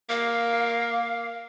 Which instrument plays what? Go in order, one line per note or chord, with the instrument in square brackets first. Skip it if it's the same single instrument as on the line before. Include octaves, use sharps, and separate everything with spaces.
[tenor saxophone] A#3 [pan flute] F5